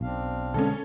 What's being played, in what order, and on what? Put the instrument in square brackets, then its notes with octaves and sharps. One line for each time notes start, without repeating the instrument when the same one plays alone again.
[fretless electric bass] B1 [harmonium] C4 D4 F5
[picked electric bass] B2 D3 G#3 [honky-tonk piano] C#4 A4